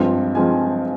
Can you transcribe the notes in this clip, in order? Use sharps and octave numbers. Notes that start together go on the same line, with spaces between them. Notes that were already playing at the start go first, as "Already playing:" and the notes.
Already playing: G2 F3 G#3 C4
F3 G#3 C4 G#5